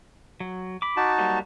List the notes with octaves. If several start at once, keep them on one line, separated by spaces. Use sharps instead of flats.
F#3
B5 D6
D#4 F#4 A5
F#3 G3 A#3